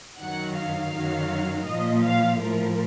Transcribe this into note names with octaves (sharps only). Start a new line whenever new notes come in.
F#2 D#3 F#3 F#5
F5
F#2 D#3 F#3
A#2 F3 D#5
F5
A2 F3 A#4